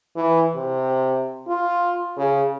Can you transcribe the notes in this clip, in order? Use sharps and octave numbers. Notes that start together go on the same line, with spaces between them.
E3
C3
F4
C#3